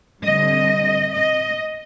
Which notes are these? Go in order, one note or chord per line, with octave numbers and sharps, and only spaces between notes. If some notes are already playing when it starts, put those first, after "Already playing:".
D3 G3 C4 D#5
D#5